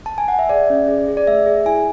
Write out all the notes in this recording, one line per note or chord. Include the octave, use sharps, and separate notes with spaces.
A5
G#5
F#5
E5
G#4 D5
C#4
G#4
G#4
D5
A3 E5
G#4
E4 G#5